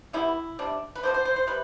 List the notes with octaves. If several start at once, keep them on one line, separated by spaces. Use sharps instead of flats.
E3 G3 B3 E4
C3 G3 D4
B4
B2 A3 D4 C5
C5
C5
C5
C3 G3 B4